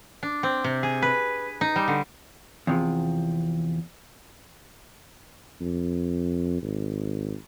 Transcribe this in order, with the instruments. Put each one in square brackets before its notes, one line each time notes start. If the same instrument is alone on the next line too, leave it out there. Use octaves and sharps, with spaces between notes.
[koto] D4
C4
C3
G#4
B4
D#4
G3
D3
[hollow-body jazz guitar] E2 C3 F3
[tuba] F2
G#1